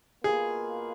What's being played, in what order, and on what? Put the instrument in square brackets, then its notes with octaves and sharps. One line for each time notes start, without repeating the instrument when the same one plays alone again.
[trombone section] B2 A#3 F4 B4 [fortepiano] G#4